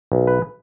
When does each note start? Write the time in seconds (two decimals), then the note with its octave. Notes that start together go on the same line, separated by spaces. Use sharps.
0.12 B1
0.27 B4